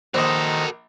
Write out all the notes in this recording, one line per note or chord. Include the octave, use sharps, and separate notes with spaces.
A#1 D#3 F#4 A4 C5 D#5 A#5